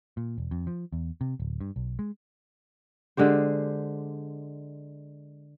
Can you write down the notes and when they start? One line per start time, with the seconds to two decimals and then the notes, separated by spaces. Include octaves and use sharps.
0.17 A#2
0.38 E1
0.51 F2
0.67 F3
0.92 E2
1.21 C3
1.40 D1
1.61 G2
1.76 B1
1.99 G#3
3.17 D3 G#3 G4 C5